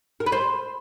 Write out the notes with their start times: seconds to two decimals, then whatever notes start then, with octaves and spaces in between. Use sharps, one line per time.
0.20 A#4
0.26 B4
0.32 C5